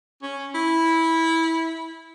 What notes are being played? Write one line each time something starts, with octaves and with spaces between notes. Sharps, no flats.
C#4
E4